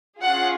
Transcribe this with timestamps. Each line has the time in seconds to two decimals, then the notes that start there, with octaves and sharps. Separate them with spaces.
0.22 C#4 F4 G#4 F#5